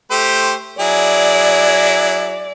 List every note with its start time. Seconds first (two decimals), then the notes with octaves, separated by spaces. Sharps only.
0.11 A3 G4 C5
0.80 F#3 E4 G#4 D5